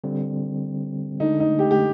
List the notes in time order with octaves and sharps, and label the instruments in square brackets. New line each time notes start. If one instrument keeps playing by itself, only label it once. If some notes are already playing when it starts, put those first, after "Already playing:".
[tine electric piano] D3 G3 C4
[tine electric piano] D3 G#3 D4 [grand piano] D#4
[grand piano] D#4
G4
G4